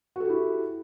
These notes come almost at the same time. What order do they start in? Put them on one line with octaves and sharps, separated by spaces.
F#4 A4 G4 E4